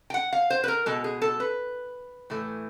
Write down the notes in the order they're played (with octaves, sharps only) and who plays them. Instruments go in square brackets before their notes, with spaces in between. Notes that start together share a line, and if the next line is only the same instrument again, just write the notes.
[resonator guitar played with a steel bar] G5
F#5
F5
C5
B4
A#4
B2 G#3 A4
G#4
A4
B4
A2 E3 A3